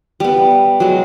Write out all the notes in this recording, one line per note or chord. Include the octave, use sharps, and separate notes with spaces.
G3 B3
F#3 G#3